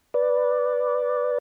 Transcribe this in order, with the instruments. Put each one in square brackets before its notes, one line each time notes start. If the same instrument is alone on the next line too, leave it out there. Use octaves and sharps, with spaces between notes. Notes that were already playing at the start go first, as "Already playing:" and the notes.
[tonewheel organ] B4 D5